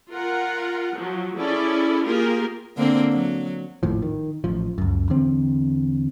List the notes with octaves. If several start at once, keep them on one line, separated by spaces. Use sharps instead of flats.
F4 A#4 F#5
F3 F#3
C#4 E4 G#4 A4 D5
A#3 F4 G4 G#4 A#4
D3 A#3 C4
F#3
G#1 D#2 A2 F3
D#3
A1 F3
C#2 F#2
E2 D3 C4